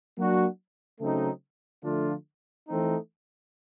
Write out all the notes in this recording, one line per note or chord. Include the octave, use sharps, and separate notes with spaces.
F#3 A#3 D4 F#4
C#3 F#3 A3 C4 D#4
D3 F3 A3 D4 F4
E3 A3 C4 D#4